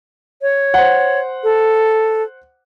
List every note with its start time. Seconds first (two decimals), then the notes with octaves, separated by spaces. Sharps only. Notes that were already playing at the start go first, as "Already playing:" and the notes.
0.42 C#5
0.74 C5 F#5
1.43 A4